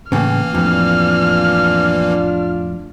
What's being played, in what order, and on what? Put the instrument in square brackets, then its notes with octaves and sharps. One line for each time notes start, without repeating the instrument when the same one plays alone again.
[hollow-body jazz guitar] A2 C#3 [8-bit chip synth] E3 A#3 [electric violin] F6
[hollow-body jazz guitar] F2 A2 [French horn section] D4 F4